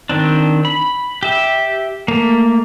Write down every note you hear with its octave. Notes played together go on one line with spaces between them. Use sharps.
D#3 C4 D4
B5
G4 E5
A3 A#3